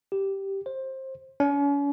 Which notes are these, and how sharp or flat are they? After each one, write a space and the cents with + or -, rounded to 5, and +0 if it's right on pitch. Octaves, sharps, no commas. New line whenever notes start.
G4 -5
C5 +20
C#4 +40